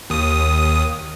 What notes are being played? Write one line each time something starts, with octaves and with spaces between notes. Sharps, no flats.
D#2 D#6